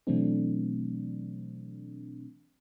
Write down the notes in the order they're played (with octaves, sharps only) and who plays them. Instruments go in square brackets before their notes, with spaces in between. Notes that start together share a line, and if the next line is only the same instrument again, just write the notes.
[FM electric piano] B2 E3 F#3 A3 C4 D4